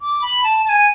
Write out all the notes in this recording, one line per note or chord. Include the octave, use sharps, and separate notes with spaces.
D6
B5
A5
A5
G#5